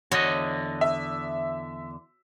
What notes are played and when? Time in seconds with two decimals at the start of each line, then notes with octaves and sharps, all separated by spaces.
0.11 E2 D3 F#4 C#5 D#5
0.81 E5